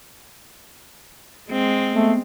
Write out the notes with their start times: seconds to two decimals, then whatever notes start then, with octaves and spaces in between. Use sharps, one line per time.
1.49 G#3 C4
1.92 A3 B3